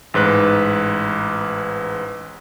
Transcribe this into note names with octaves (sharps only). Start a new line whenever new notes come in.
A1 G#2 B4 F#6